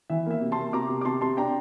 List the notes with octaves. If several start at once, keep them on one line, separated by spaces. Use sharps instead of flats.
E3 E5
A#3 E5
C3
A5 C6
A#3
C3 A#5 D6
C3
D6
C3 A5 C6
C3 A5 C6
D4 G5 A#5